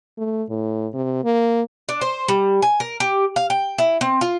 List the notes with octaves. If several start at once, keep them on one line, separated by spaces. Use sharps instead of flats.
A3
A2
C3
A#3
D4
C5
G3
G#5
A#4
G4
F5
G5
E4
C4
F4